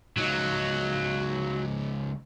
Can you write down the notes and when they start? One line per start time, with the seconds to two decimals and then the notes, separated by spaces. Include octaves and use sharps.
0.17 C#2 F#3 D#4